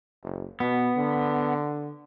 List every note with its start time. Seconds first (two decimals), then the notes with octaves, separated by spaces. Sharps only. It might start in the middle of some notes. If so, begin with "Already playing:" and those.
0.23 F#1
0.60 B2 B3
0.97 D3